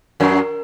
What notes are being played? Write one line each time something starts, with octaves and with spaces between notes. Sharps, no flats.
F#2 F#3 A#4